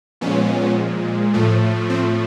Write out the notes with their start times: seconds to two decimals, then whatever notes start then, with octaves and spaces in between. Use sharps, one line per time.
0.21 A#2 F3 G#3 B3 C#4
1.34 A2 F3 A3
1.90 C4